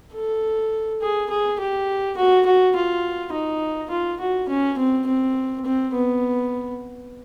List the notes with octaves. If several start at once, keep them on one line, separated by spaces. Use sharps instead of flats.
A4
G#4
G#4
G4
F#4
F#4
F4
D#4
F4
F#4
C#4
C4
C4
C4
B3